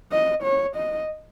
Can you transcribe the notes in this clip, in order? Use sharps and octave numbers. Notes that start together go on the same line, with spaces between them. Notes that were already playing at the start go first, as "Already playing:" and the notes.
D#5
C#5
D#5